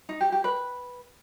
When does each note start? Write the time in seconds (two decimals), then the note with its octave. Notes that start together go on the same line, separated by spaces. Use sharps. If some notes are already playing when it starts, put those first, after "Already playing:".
0.09 D#4
0.21 G4
0.32 G4
0.44 B4